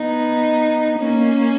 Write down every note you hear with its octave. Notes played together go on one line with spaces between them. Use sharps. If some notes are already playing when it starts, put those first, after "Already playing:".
Already playing: B3 D#4
A#3 C#4